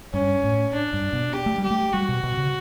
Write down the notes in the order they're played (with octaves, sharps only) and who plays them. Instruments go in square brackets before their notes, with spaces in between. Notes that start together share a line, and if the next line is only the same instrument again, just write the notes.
[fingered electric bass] G2 [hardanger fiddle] C#4
[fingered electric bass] A2
[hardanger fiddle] D4
[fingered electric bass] G2
B2
[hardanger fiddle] G4
[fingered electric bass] A3
G3
[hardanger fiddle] G4
[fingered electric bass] A3
[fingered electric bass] G3 [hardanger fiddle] F#4
[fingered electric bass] B2
B2
C#3